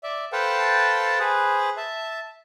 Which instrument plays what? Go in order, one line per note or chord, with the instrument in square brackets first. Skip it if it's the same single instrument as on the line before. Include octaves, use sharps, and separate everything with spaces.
[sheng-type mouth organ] D5 E5
A4 B4 C5 F5 G5 A5
G#4 B4 C5
E5 A5